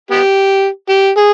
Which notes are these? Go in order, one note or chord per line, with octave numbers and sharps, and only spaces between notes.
B3 G4
G4
G#4